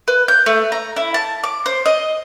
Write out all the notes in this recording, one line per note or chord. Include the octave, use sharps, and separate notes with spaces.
B4
G6
A3
A#5
E4
A5
D6
C5
D#5